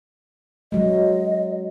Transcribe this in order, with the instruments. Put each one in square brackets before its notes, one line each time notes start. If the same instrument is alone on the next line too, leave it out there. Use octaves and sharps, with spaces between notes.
[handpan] F#3 G#3 [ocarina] D#5